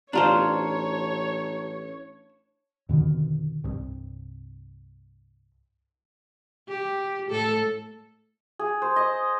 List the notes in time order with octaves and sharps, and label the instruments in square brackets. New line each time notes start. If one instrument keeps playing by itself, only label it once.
[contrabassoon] A1 [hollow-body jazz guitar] D4 F4 C5 [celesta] G4 A5 A#5 [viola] C#5
[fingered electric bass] F2 B2 D3 D#3
C2 G2
[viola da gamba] G4
A2 A4
[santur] G#4
C5
D#5